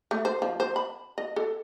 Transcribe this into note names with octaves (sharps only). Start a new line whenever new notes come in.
A3
C5
F3
C5
B5
D#5
A4